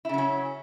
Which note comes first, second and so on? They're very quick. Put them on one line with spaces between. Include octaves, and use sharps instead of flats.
E4 C#3 F#3 C#4